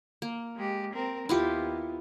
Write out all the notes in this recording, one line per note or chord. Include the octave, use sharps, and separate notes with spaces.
A#3
G#3 G4
C4 A#4
D#2 B3 E4 F4 G4